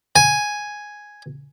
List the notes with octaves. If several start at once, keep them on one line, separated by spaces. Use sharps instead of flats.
G#5